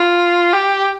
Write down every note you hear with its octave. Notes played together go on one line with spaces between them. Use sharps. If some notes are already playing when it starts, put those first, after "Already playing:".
Already playing: F4
G4